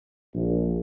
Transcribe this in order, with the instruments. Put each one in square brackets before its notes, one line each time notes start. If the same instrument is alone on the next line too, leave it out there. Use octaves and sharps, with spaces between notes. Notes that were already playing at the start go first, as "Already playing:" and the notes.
[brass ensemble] A#1